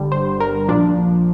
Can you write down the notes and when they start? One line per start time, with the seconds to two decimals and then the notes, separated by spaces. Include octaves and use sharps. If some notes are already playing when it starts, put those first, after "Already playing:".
Already playing: G1 G2 D3 G3
0.12 C5
0.40 A#4
0.69 A#1 A#2 F3 D4